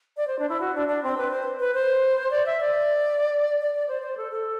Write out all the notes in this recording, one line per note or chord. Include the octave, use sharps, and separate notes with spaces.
D5
C5
D4
E4
F#4
D4
D4
C4
B4
C5
B4
C5
D5
E5
D5
D5
D5
C5
C5
A4
A4